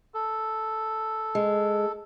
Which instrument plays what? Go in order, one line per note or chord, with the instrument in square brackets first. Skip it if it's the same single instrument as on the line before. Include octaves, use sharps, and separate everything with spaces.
[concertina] A4
[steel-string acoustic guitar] G#3